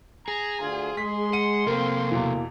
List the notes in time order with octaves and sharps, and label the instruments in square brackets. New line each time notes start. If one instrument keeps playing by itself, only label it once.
[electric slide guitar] G#4 [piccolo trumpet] A#5
[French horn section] D2 [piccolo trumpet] F4
[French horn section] G#3 [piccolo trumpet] C6 [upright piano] B6
[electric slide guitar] F#5 [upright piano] D#7
[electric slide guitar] C3 A4 [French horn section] A#3 [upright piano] C4 A#4
[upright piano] E2 B2 E3